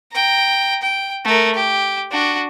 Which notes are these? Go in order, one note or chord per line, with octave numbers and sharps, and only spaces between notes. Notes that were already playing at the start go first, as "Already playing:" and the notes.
G5 A#5
G5
A3 A#4
G4
D4 F#4